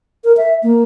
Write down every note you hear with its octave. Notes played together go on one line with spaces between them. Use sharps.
A#4
E5
A#3